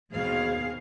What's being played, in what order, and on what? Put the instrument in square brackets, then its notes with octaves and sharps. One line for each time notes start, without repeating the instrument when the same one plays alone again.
[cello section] D#2 B2 C4 G#4 F5